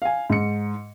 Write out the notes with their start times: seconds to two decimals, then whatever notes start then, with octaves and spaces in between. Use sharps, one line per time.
0.02 F5 G#5
0.30 G#2 C#7